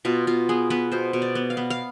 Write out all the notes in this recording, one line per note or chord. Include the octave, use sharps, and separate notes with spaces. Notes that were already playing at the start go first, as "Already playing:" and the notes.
B2 F4
B2 F4
B3 G#4
B3 B4
B2 C5
B2
D5
B3
F5
B3
F5